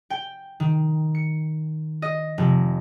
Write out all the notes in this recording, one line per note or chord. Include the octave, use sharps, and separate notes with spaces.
G5
D#3
C#7
D#5
F1